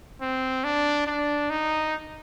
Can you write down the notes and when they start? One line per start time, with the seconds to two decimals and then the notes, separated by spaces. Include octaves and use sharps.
0.21 C4
0.64 D4
1.07 D4
1.50 D#4